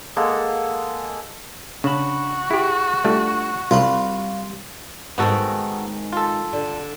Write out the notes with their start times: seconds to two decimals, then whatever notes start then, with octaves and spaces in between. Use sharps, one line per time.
0.16 G#3 A#3 A4 F#5
1.84 C#3 D4 F#4 A5 B5
2.51 E4 G4 G#4
3.05 G3 A3 D4 F4
3.71 C2 G3 F4 B5 C6
5.18 G#2 D#3 B3 C4 F#4 A4
6.13 F4 A4
6.53 D3